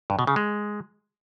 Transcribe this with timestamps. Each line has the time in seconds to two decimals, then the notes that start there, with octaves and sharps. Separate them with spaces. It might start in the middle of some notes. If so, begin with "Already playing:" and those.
0.10 G2
0.19 B2
0.27 C#3
0.36 G#3